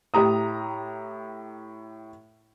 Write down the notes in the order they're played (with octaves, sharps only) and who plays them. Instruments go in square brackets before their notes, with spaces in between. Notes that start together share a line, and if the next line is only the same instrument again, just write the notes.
[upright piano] A2 G4 A#5 D#6